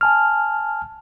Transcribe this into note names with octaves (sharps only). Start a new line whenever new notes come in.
G#5 A5 F6